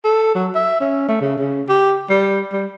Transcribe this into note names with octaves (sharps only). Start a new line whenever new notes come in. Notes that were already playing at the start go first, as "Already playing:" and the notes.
A4
F#3
E5
C#4
A3
C#3
C#3
G4
G3
G3